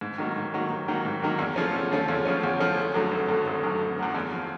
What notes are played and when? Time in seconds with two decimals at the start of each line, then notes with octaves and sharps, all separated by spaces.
0.01 G#2
0.18 D#3 F#3 A#3
0.36 G#2
0.54 D#3 F#3 A#3
0.70 G#2
0.88 D#3 F#3 A#3
1.05 G#2
1.22 D#3 F#3 A#3
1.39 E2
1.56 C#3 F3 A3 C#4
1.74 E2
1.91 C#3 F3 A3 C#4
2.08 E2
2.25 C#3 F3 A3 C#4
2.43 E2
2.60 C#3 F3 A3 C#4
2.77 G#1
2.94 F#2 D3 F#3 A3
3.11 G#1
3.29 F#2 D3 F#3 A3
3.47 G#1
3.63 F#2 D3 F#3 A3
3.81 G#1
3.98 F#2 D3 F#3 A3
4.15 E2
4.32 C#3 F3